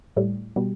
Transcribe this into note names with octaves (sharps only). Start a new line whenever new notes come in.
A2 G3
B2 G3